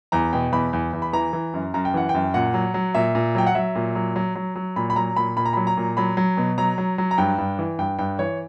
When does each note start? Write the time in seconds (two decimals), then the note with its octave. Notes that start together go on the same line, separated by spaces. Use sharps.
0.12 E2 A#5
0.33 B2 G5
0.52 E2 B5
0.73 E2
0.93 E2
1.02 B5
1.13 E3 A#5
1.33 E3
1.54 F#2
1.74 F#2 A#5
1.85 G5
1.94 E3 F#5
2.09 F#2 G5
2.34 A#2 F#5
2.54 F#3
2.74 F#3
2.94 A#2 E5
3.15 A#2
3.35 F#3 G5
3.47 F#5
3.55 F#3 E5
3.75 A#2
3.95 F#3
4.16 F#3
4.35 F#3
4.56 F#3
4.76 A#2 B5
4.90 B5
4.96 F#3 A#5
5.16 A#2 B5
5.36 A#2 B5
5.46 A#5
5.53 F#3 B5
5.67 A#5
5.77 A#2
5.97 F#3 B5
6.17 F#3
6.37 B2
6.58 F#3 A#5
6.78 F#3
6.98 F#3
7.11 A#5
7.18 G2 G5
7.38 G2
7.59 E3
7.79 G2 G5
7.99 G2 G5
8.19 E3 C#5